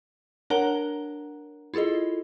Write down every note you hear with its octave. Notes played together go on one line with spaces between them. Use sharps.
D4 A#4 C#5 F#5 A#5 G7
E4 F4 G#4 A4 D#5